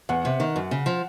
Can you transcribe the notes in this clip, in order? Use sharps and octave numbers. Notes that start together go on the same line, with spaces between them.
E2 F#5
C3
D#3
F#2
C#3
F3